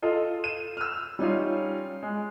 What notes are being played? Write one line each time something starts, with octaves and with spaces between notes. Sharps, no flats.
F4 A4 D#5
D#7 E7
E6 F6
G3 C#4 D#4 F4
G#3